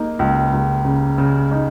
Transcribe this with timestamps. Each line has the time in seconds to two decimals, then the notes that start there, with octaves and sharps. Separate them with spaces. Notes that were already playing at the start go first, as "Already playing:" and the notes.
Already playing: A#3 D#4
0.19 C#2
0.53 C#2
0.85 C#3
1.18 C#3
1.51 D#4